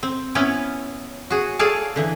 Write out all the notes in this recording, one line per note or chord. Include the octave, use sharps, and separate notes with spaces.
C4
B3 C#4 E4 C#5
F#4 G#4
G#4 A4 C#5 D5 F5 A5
D3 E3